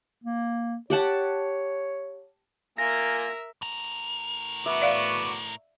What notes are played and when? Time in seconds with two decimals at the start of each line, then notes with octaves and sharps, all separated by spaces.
0.24 A#3
0.90 G4 C#5 F#5 A5
2.78 A#3 F4 A#4 E5 G#5 A#6
3.62 A2 A#4
4.66 B3 F#4 E5 D6
4.82 D5 F5